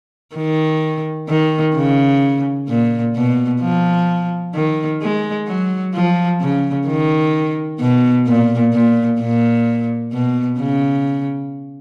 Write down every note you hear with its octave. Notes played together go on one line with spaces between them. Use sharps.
D#3
D#3
C#3
A#2
B2
F3
D#3
G#3
F#3
F3
C#3
D#3
B2
A#2
A#2
A#2
B2
C#3